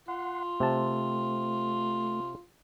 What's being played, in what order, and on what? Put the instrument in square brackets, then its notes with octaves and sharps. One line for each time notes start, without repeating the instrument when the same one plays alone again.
[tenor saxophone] F4 [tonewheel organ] F#5 C6
[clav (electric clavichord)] C3 A5 [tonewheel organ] A3